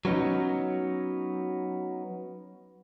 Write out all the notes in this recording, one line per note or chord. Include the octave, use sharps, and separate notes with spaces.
F#3 B3 C#4 D#4